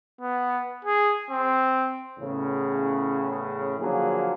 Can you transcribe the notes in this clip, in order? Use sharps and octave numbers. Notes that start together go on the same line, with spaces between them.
B3
G#4
C4
E2 A2 C#3
D3 F3 F#3 A#3 G#4